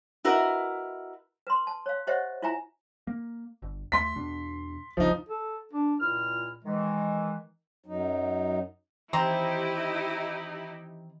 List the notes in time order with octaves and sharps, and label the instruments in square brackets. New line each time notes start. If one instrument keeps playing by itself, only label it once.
[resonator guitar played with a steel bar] E4 F#4 A#4 B4 D#5
[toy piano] B4 C6
A5
C#5 F5
G4 C5 C#5 D#5 E5 F#5
E4 F4 E5 G#5 A#5
[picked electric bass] A#3
G1
[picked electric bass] D#2 A3 [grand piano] C6 B6
[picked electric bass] E2 B2 D4
[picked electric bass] G1 D2 C#3 [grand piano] F3 D#4
[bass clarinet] A4
D4
[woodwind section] C#2 E4 F6 [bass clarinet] A#2
[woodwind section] D#3 E3 [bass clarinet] G#3
[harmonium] F#2 F#3 D#4
[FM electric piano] D#3 E3 [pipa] C4 C5 A#5 [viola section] D#4 E4 G4